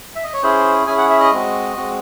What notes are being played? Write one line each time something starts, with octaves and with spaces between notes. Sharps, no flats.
E5
D#5
C#5
C#4 E4 G#4 C5
C#4 E4 G#4 G#5
F#5
E5
D#5
G#3 C4 F#4
G#3 C4 F#4